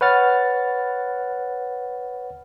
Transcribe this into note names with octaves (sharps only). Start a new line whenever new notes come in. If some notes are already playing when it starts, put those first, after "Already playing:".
B4 C#5 F#5 F6 A6